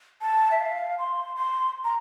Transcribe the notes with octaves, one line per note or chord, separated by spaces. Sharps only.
A5
E5
F5
C6
C6
A#5